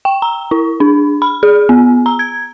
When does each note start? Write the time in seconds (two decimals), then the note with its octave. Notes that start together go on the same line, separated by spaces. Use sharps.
0.05 G5
0.22 A#5
0.51 E4
0.80 D4
1.22 B5
1.43 G#4
1.69 B3
2.06 A#5
2.19 G#6